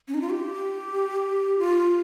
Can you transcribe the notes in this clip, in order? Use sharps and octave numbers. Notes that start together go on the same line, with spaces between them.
C#4
D#4
F4
G4
F4